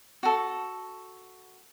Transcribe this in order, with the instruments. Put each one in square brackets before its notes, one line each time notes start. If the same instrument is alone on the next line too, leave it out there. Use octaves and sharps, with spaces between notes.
[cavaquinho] F#4 A4